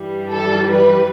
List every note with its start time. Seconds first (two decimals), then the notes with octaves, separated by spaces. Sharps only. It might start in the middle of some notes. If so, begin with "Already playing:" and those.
Already playing: G2 E3 G3
0.31 A4
0.71 B4